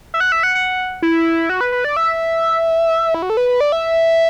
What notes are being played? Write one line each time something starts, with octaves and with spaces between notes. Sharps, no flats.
E5
F#5
E5
F#5
F#5
E4
F#4
B4
B4
D5
E5
E4
F#4
A4
B4
B4
D5
E5